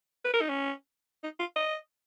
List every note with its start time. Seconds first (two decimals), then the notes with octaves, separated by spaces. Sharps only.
0.25 B4
0.34 A#4
0.41 D#4
0.49 C#4
1.23 D#4
1.40 F4
1.56 D#5